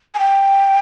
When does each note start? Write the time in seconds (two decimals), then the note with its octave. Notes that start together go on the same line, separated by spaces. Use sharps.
0.14 G#5
0.19 G5